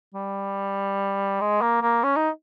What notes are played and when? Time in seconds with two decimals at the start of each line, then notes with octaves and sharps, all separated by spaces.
0.15 G3
1.41 G#3
1.62 A#3
1.82 A#3
2.04 C#4
2.16 D#4